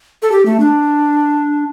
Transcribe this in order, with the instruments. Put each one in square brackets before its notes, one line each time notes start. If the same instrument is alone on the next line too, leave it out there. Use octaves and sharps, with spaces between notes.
[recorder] A4
G4
A3
D4